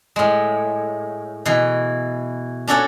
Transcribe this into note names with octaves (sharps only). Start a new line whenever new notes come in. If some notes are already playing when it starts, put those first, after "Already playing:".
A2 G#3
B2 E3
C#4 D4 F#4 A4 C#5